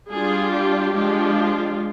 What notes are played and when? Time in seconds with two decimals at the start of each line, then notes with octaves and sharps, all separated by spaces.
0.10 G3 D4 F4 G#4
0.53 G4
0.95 F3 G#3 D4 F4